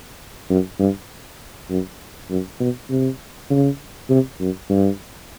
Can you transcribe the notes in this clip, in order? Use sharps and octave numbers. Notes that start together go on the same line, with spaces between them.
F#2
G2
F#2
F#2
B2
C3
C#3
C3
F#2
G2